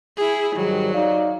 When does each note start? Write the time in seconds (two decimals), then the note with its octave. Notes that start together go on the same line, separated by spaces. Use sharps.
0.17 E4 G#4
0.56 G#2 D#3 F#3 G3
0.94 D#4 D5 F5